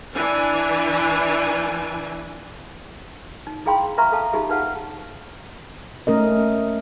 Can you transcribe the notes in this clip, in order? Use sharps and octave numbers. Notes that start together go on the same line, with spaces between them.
E3 D4 G#5
D#4
E4 G#4 F5 G5 B5 C6
B4 E5 F5 A#5 C6 C#6
A4 F5 A5
D#4 F4 G4 G#4 E5
D#4 B4 F5 F#5 A5
A3 C#4 A#4 D#5